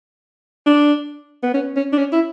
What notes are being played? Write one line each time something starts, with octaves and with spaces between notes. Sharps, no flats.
D4
B3
C#4
C#4
D4
C#4
E4